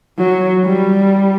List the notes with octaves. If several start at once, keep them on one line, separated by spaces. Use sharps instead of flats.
F#3
G3